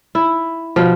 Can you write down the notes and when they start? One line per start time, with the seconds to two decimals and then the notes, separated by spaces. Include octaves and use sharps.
0.15 E4
0.76 B2 F3